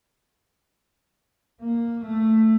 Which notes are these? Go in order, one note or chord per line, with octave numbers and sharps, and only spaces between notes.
A#3
A3